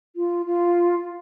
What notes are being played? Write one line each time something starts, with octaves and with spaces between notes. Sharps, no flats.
F4
F4